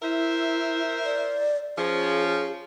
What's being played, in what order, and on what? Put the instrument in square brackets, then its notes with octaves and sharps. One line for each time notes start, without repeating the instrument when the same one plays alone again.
[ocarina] E4 [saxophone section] A#4 C5 E5
[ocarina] D5
[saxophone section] F3 C#4 [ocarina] G#4